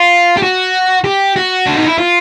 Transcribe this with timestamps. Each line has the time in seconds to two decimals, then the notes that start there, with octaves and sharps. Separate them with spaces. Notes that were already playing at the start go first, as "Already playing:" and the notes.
Already playing: F4
0.37 G4
0.42 F#4
1.04 G4
1.36 F#4
1.66 D4
1.76 D#4
1.86 E4
1.98 F4